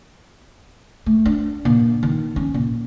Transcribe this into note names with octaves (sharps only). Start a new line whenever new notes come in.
A3
D4
A#2
D#3
C#4
A#2